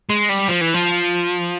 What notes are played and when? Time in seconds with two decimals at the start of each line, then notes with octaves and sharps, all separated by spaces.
0.09 G#3
0.29 G3
0.48 F3
0.61 E3
0.74 F3